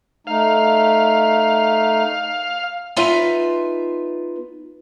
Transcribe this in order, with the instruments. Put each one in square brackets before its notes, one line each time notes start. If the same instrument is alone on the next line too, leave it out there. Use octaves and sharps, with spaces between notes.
[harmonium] A3 D#4 [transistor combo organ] F5
[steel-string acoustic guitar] B3 D#4 F4 B4 E5 G#5